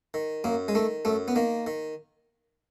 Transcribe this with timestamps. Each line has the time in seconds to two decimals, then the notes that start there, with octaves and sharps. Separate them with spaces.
0.14 D#3
0.44 F#2 A#3
0.68 G#3
0.75 D#3 A3
1.05 F#2 A3
1.28 B3
1.36 D#3 A#3
1.67 D#3